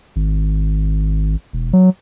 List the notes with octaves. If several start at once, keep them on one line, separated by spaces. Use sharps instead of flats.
G#1
E1
F#3